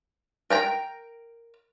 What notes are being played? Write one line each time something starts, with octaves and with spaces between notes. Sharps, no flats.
A#4 G5 A#5